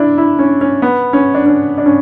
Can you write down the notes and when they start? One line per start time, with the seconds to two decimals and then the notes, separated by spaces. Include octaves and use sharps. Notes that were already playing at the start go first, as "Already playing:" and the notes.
Already playing: D4 E4
0.18 E4
0.39 C#4
0.61 C#4
0.82 B3
1.13 C#4
1.34 D4
1.46 C#4
1.78 D4
1.86 C#4